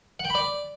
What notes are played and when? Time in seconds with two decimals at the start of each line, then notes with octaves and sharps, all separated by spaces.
0.20 F#5
0.25 G5
0.30 B5
0.35 D5